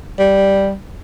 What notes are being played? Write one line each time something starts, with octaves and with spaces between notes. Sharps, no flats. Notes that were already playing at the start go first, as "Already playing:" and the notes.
G3